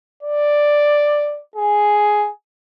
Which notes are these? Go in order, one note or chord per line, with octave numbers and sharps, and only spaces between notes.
D5
G#4